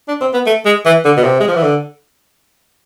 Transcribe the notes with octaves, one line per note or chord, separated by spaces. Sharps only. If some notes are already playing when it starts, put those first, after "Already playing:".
D4
C4
B3
A3
G#3
E3
D3
B2
C3
G#3
F3
E3
D3